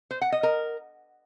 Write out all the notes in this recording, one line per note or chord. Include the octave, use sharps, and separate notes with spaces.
C5
F#5
D#5
A#4